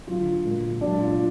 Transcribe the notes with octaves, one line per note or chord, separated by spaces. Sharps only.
D3 F#3 F4
A#2 G#3
A#2 F#3 D4
F4